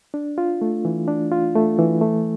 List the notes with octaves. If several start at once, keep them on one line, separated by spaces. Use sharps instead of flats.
D4
F4
A3
E3
D4
F4
A3
E3
A3